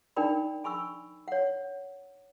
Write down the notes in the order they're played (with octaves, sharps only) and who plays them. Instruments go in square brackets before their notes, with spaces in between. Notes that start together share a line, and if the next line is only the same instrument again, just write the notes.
[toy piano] D4 D#4 A#4 D5 G5 B5
G#5 B5 C#6 E6
C#5 F#5